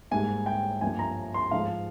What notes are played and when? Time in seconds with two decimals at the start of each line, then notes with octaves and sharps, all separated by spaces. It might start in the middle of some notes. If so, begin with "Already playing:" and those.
0.11 G#2 G3 A#3 G#5
0.46 G5
0.81 G2 F3 A#3 G#5
0.99 A#5
1.34 C6
1.51 G#2 F3 G#3 F5